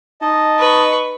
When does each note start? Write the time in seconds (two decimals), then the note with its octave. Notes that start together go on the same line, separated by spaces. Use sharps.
0.21 D#4 D#5 A5
0.59 B4 C#6